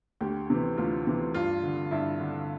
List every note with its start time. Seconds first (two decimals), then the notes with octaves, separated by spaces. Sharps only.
0.21 D2 G4
0.50 C3 E3
0.77 D2 F4
1.07 C3 E3
1.34 G2 F4
1.63 D3
1.91 G2 E4
2.20 D3